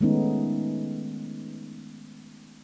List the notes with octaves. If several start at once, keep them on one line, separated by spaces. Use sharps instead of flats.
D#3 G#3 A3 B3 C#4 D#4